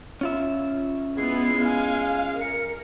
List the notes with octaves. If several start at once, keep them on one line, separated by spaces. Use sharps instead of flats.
C#4 F4 E5
G#3 B3 E4 G#4 C7
F5 G#5
A#4 C#7